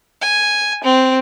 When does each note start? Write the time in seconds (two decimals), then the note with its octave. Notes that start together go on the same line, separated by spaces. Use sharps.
0.21 G#5
0.84 C4